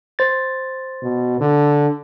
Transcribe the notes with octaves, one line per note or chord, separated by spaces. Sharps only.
C5 A6
B2
D3